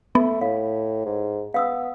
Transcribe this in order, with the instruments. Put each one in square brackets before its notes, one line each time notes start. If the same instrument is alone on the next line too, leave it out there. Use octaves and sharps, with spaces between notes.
[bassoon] A3 [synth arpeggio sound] B3
[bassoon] A2 [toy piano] F5
[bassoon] G#2
[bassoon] B3 [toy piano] F5 D#6 E6